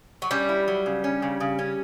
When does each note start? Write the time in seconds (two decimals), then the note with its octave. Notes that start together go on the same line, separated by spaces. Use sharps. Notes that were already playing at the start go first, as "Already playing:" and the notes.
0.22 F#3
0.31 G3 C#4
0.49 E4
0.68 F#3
0.86 C#3
1.04 C#4
1.22 C#3
1.40 C#3
1.59 C#4